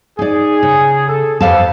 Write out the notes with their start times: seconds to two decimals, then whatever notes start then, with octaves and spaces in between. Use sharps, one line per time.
0.19 D#4 G#4 D5
0.63 C#3
1.08 A4
1.41 F2 B3 G4 A4 F5 A5